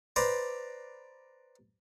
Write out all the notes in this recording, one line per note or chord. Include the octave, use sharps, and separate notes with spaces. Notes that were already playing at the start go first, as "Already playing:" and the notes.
B4 C5 D5 A#5